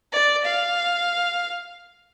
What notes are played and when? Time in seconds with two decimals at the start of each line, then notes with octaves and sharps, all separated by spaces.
0.12 D5
0.45 F5